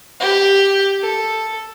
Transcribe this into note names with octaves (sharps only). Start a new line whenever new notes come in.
G4
A4